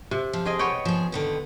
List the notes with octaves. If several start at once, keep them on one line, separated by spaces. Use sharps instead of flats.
C3
F3
C4 G#4 D#5
B3 C#5 G5
F3 G#4
D3 D#3 B4